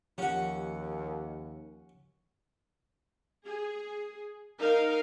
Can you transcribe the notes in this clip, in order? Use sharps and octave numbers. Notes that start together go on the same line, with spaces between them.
D#2 F3 C#4 F#4 G4 F#5
G#4
D#4 A#4 F5